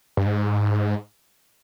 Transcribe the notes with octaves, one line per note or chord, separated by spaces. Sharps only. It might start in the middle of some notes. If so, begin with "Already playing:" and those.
G2
G#2